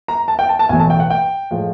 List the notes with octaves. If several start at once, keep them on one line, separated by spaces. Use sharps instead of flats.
A#5
A5
G5
A5
A5
B1 A2 E3 G#5
A5
G5
F#5
G5
A2 F3 G#3